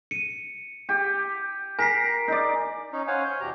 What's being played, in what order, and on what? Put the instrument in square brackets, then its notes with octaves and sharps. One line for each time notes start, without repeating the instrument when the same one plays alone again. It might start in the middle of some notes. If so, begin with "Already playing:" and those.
[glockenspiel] C#7 D#7
[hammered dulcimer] G4
[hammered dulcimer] A#4 [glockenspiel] G#5 B6 C7
[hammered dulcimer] D#4 D5
[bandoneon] C#4 D#4
C#4 C5 C#5 F5 F#5 G#5
C#5 G6
E2 B2 G4 A#5